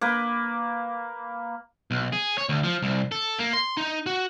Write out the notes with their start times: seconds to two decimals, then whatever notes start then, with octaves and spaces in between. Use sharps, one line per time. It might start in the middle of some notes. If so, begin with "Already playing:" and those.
0.01 A#3 B4
1.91 B1
2.13 G#4
2.38 C#5
2.49 D2
2.64 F3
2.83 C2
3.12 A4
3.39 A#3
3.53 C6
3.77 D#4
4.06 F#4